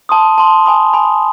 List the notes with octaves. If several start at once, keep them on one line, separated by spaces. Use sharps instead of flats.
A5 C6 D#6
A5 C6 D#6
G#5 B5 D#6
G#5 B5 D#6